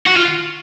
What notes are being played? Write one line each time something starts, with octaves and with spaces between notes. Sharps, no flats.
F#4
F4